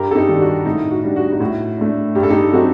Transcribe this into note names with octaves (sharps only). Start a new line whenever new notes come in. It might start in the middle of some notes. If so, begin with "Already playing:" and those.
Already playing: G2 G4 A#4
A4
D#4 G4
D#3 G3 D4
F#4
A2 D#4
F#4
G3 D4
F#4
D#4
A2 F#4
A3 D4
G2 G4
A4
D#4 G4
F#3 C4 D#4 F#4 A4